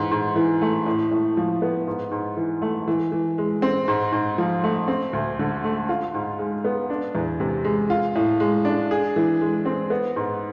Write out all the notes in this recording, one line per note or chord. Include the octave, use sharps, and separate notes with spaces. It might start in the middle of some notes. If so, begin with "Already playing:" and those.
Already playing: G#2 E3
G#2
E3
A3
A2
A2
F3
B3
G#2
G#2
E3
A3
E3
E3
G#3
C4
G#2
G#2
F3
A3
C4
D2
D3
A3
F4
G#2
G#3
B3
D4
E2
C3
G#3
F4
A2
G#3
D4
G#4
E3
G#3
C4
B3
G#2